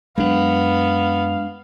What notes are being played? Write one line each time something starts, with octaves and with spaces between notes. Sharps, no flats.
F#2 G#3 B3 D4 F5